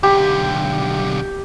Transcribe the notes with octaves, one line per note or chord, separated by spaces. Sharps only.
B1 D3 G4